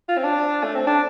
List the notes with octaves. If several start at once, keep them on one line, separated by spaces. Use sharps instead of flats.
F4
C4
D4
A3
C4
D4